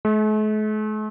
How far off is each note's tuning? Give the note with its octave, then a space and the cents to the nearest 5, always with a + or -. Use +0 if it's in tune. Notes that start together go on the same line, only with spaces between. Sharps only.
A3 -45